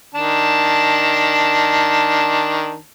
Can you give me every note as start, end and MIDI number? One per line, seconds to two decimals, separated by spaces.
0.15 2.77 51
0.15 2.77 62
0.15 2.77 81